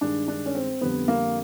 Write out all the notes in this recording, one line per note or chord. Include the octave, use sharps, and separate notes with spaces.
G2 D#3 G#3 D4
D4
C#4
C4
F2 D3 G3 B3
A#3